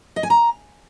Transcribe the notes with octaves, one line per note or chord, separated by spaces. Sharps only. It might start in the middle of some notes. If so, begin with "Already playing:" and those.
D#5
G#5
A#5